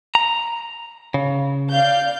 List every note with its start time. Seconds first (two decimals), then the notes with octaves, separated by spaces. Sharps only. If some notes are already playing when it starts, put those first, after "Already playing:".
0.15 A#5
1.14 C#3
1.70 D5 F5 G6